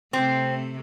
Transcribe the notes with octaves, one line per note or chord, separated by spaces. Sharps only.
C3 A3 C4